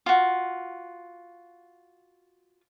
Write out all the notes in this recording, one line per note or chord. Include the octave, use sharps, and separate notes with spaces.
F4 F#4